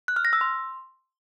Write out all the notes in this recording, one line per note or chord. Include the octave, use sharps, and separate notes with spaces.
F#6
F6
A#6
E6
C6